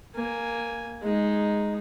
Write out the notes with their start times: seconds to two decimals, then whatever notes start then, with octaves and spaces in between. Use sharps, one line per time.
0.15 A#3 G#5
1.02 G#3 D#4